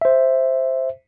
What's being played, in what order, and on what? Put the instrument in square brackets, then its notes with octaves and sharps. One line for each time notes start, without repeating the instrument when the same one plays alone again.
[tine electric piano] C5 E5